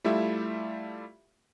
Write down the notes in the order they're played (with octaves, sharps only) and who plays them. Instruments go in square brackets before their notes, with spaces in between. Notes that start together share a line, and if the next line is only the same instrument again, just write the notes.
[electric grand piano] G3 A3 E4 F4 G4 E5